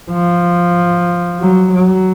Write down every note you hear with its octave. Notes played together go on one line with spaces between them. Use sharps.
F3
F#3
F#3